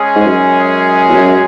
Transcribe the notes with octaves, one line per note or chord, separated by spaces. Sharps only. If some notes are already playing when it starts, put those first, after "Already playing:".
Already playing: G#3 C#4 G#4
G#2
F#2
E2
F#2